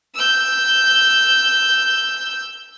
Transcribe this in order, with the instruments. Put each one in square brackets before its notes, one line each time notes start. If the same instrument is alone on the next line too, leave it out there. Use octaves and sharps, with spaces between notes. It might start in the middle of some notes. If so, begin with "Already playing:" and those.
[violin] E6 G6